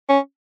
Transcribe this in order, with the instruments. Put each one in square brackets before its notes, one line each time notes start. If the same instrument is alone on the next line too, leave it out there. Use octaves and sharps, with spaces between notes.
[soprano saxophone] C#4